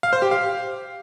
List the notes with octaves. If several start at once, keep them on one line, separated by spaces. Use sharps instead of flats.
F5
C5
G4
F5